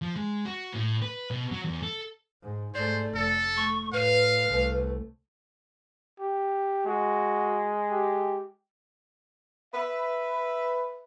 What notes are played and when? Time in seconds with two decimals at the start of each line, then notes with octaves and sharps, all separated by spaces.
0.02 F3
0.16 G#3
0.45 F#4
0.73 A2
1.02 B4
1.30 B2
1.51 F#3
1.65 E2
1.83 A4
2.43 G#2
2.75 G#2 A3 C5 D5
3.15 F1 A4
3.57 A3 C#6
3.93 A2 B4 F5
4.49 C2 A3
6.20 G4
6.87 G#3 F#4
7.88 G4
9.74 B4 E5